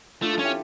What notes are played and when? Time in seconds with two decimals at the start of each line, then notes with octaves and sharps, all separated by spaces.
0.22 A3 D4 F4
0.33 F4 A4
0.39 C#4
0.44 E4 G4